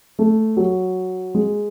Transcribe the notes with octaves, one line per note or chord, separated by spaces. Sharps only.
A3
F#3
G#3